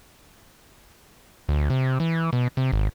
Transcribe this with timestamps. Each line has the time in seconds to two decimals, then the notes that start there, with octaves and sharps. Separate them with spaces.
1.49 D2
1.70 C3
2.00 E3
2.33 B2
2.57 C3
2.72 G#1